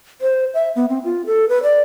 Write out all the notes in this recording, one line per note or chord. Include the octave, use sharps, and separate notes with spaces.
C5
E5
B3
C4
F4
A4
B4
D5